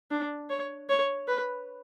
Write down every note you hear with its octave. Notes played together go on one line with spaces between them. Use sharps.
D4
C#5
C#5
B4